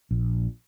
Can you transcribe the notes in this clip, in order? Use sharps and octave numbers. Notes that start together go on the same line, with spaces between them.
A#1